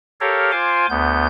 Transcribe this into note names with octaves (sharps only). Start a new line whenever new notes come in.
G4 A4 A#4 C#5 F5
F4 C5 G#5 C6 D6
D2 B3 G6